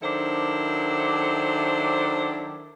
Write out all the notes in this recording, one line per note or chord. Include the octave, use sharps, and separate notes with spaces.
D#3 F#3 D4 E4 A4 C5